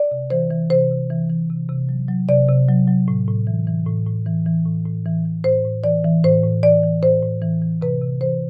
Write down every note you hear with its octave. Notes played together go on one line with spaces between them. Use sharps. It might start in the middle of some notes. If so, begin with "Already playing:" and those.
Already playing: D5
C3
E3 C5
E3
C3 C5
C3
E3
E3
C3
C3
F#3
F#3
C3 D5
C3
F#3
F#3
A2
A2
E3
E3
A2
A2
E3
E3
A2
A2
E3
E3
A2 C5
A2
E3 D5
E3
A2 C5
A2
E3 D5
E3
A2 C5
A2
E3
E3
C3 B4
C3
E3 C5